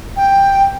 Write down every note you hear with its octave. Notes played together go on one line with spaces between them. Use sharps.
G5